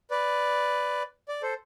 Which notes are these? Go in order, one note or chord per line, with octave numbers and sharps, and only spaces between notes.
B4 D5
D5
A4 C5